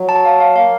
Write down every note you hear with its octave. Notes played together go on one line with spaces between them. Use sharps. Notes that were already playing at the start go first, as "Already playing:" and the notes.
Already playing: F#3
A5
F5
F5
A#3 F5